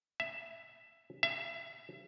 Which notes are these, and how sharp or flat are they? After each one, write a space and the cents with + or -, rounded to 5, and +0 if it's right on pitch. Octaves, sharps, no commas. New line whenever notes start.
E5 +15
E5 +30